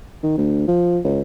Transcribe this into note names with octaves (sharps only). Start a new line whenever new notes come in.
D#3
D2
F3
C#2